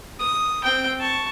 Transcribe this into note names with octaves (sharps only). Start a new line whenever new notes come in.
D#6
C4 G5
A5 C#6